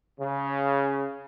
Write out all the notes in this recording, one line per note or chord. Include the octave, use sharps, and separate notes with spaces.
C#3